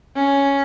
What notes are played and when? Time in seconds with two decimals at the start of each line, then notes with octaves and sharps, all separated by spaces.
0.16 C#4